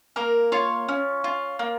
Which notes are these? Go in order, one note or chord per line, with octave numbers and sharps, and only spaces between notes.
A#3 A#4
F4 C#5
C#4
F4
A#3